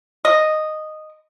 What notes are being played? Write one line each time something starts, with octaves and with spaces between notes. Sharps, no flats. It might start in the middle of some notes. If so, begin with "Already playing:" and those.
D#5